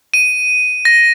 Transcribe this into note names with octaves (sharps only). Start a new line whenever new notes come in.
D#7
A#6